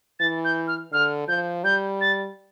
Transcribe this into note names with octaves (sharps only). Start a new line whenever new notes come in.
E3 A6
G6
F6
D3 F6
F3 G6
G3 G6
A6